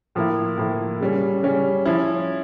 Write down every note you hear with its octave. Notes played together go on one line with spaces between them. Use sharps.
A2 F3 A#3 E4
A2 F3 A#3 E4
C#3 G3 C#4
C#3 G3 C#4
F3 C#4 E4